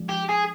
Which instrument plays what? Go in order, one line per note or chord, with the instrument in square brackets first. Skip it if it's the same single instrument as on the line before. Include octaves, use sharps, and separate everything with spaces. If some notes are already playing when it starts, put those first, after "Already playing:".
Already playing: [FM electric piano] F3 G#3 D4
[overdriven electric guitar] G4
G#4